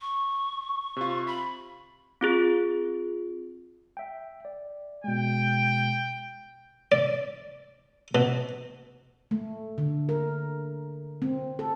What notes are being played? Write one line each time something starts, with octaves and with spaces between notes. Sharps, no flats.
C#6
C3 F4
B5 B6
C4 F4 G#4
E5 G5
D5
B2 G#3 G5
D5
B2
A3
D3
A#4
C4
A4